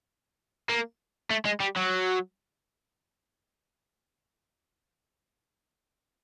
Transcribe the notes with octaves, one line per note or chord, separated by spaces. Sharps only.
A#3
A3
G#3
G3
F#3